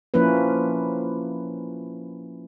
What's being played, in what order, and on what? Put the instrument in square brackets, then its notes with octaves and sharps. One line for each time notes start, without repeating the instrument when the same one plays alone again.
[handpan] F3 A#3 C#4 E4 B4